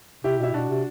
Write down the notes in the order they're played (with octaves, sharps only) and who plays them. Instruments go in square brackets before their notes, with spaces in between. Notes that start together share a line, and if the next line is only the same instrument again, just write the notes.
[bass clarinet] C3 [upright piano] E4 G4
[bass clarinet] B2 [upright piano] E4
[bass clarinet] B2 [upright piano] D4 F#4
[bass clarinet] C3